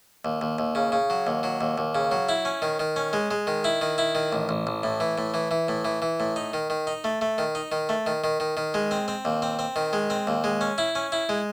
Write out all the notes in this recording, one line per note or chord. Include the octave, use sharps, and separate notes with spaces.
D#2
D#2
D#2
C#3
C#3
F#3
D#2
F#3
D#2
D#2
C#3
F#3
E4
C#4
D#3
D#3
C#4
G#3
G#3
D#3
E4
D#3
E4
D#3
A1
A1
A1
A2
E3
A2
E3
E3
A2
E3
E3
A2
D#4
D#3
D#3
D#4
A3
A3
D#3
D#4
D#3
A3
D#3
D#3
D#3
D#3
G#3
C4
C4
D#2
C4
C4
D#3
G#3
C4
D#2
G#3
C#4
E4
C#4
E4
G#3